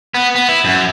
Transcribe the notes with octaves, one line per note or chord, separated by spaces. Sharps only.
B3
B3
E4
F#2